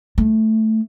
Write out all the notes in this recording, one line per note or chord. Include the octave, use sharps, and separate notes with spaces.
A3